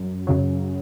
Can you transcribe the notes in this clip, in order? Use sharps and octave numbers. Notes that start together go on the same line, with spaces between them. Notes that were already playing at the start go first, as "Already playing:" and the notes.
Already playing: F#2
F#2 C#3 F#3